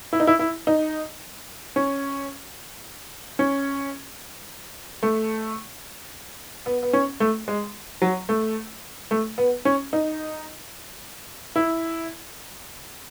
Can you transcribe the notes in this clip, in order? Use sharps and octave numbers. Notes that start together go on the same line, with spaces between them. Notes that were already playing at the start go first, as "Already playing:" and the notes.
E4
D#4
E4
E4
D#4
C#4
C#4
A3
B3
B3
C#4
A3
G#3
F#3
A3
A3
B3
C#4
D#4
E4